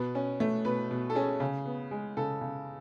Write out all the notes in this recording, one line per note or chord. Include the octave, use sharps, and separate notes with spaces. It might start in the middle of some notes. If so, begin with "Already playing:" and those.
Already playing: B2 B4
C#4
A3
B2 B4
B2
A4
C#4 G#4
C#3
B3
G#3
C#3 A4
C#3